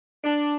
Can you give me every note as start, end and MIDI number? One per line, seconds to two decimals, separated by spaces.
0.24 0.56 62